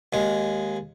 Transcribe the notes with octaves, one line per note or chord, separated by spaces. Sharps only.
D#2 G#3